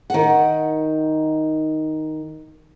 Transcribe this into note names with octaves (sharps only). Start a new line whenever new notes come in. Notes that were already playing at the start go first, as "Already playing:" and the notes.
D#3 F#5